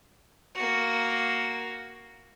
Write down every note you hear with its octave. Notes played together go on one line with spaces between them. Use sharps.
A#3 F#4